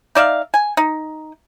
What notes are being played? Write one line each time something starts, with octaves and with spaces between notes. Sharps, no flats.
D#4 D5 E5 F5
G#5
D#4